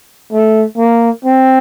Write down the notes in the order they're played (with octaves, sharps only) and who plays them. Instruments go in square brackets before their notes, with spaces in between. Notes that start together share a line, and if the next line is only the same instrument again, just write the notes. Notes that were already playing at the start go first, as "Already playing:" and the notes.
[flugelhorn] A3
A#3
C4